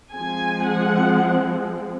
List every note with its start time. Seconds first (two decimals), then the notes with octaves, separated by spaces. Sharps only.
0.13 F3 G#3 C4 G#5
0.66 F#5